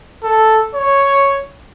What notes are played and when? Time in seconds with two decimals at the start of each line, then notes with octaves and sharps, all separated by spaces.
0.24 A4
0.75 C#5